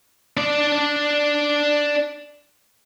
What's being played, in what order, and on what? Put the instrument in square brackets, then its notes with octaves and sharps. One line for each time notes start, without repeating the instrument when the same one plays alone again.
[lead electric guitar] D4 D5